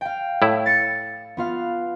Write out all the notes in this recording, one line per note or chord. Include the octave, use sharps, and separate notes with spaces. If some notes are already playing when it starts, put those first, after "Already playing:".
F5 G5
A2 E4
A6 C#7
B3 F4 F5